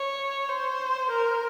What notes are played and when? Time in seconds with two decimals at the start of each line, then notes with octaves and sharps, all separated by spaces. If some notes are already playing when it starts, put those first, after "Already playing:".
Already playing: C#5
0.48 C5
1.10 A#4